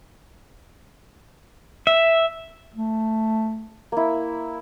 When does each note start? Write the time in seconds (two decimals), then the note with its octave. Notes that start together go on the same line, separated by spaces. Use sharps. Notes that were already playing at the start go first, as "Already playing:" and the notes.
1.87 E5
2.75 A3
3.92 A#3 E4